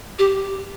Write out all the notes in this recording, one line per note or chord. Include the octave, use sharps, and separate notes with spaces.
G4